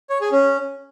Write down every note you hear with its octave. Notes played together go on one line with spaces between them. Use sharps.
C#5
G#4
C#4